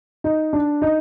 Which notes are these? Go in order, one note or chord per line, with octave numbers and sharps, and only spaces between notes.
D#4
D4
D#4